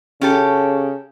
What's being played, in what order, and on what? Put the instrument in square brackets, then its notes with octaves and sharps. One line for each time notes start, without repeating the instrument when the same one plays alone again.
[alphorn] C#3 [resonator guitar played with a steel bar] C#4 G4 A4